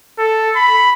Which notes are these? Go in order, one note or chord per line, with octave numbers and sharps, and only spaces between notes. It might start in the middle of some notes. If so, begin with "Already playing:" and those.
A4
B5